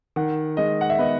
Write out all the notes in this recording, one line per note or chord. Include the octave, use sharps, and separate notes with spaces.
D#3 F#5
G#3 D#5
F#5
E5
B3 D#5